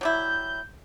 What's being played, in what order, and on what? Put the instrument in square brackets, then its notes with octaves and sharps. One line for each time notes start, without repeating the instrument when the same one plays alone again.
[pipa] F#3 G3 E4 [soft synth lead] G6